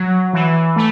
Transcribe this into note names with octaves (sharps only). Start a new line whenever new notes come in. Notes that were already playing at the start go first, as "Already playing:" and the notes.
Already playing: F#3
E3
A3